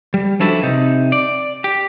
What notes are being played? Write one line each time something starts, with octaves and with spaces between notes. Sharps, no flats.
G3
F3 D4 E4 F#4 A4 B4
C3 D#4
D5
G4